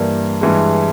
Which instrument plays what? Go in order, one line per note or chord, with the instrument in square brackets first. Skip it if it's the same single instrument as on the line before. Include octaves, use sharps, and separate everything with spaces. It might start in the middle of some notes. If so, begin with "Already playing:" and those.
Already playing: [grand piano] G2 E3 G3 A#3 D4
G2 E3 G#3